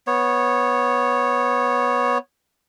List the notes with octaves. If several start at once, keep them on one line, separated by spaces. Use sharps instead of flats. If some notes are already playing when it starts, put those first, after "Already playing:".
B3 C#5